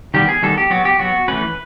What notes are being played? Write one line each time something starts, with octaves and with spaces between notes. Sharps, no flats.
D#3 G3 B3 G4
G#4
D#3 G3 B3 A4
G4
F#3 B3 F#4
G4
F#3 B3 F#4
E3 A3 C#4 B4